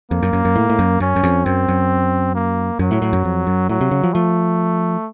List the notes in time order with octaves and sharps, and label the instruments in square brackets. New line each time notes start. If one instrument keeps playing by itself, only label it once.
[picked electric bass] F2 [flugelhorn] A#3
[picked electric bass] F#2
F#2
F#2
A2
A2
F#2
[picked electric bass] F#2 [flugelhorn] C#4
[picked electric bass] F#2
F2
[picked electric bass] F#2 [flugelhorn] C4
[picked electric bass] F#2
[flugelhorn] A#3
[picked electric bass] F#2 [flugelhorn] F#3
[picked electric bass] A2
A2
F#2
F2
F#2
[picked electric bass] A2 [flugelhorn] F#3
[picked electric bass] C3
C#3
F3
[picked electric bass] F3 [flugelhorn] A3